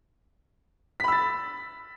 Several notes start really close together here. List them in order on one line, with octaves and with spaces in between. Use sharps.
B6 B5 E6 A6